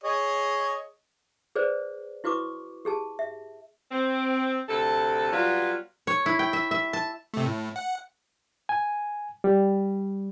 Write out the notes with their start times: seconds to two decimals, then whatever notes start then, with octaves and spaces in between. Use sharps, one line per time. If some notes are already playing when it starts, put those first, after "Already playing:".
0.03 G#4 C#5 D#5
1.56 G#4 B4 C5 D5
2.24 E4 F#4 B4 C#6 D6
2.85 G4 G#4 A5
3.19 E5
3.91 C4
4.69 D2 C3 A4
5.32 F#3 G3 B3 F4
6.07 C#5
6.26 E4
6.39 G5
6.53 E5
6.71 E5
6.93 A5
7.34 C3 A3
7.46 A2
7.76 F#5
8.69 G#5
9.44 G3